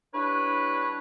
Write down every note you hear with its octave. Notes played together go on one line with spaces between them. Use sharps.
G3 D4 E4 B4 C#5